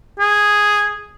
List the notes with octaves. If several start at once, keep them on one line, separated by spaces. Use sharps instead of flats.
G#4